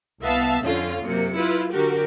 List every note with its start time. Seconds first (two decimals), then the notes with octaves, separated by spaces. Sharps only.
0.21 C2 B3 E5 F5 A5
0.62 F2 D3 C#4 F4
1.03 F#2 C3 A#3 C#7
1.36 E4 F4 B4
1.73 D3 F#4 G4 A#4